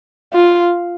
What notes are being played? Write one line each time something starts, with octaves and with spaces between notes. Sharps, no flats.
F4